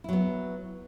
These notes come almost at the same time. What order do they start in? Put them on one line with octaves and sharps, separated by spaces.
E4 F#3 B3